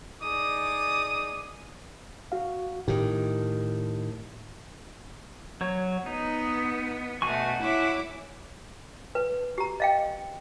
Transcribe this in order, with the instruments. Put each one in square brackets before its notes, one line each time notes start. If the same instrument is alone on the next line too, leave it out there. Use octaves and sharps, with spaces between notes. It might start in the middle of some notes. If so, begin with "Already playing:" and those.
[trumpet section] D#4 G#4 D5 D6 D#6
[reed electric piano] F#4 F5
[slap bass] A2 D#3 [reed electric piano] G4
[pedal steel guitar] F#3 C#5
[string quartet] B3 [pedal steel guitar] D#4
[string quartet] B2 A3 [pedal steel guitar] F#4 G#5 C#6
[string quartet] E4 C#5 D6
[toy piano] B4
G4 A#5
D#5 F5 G5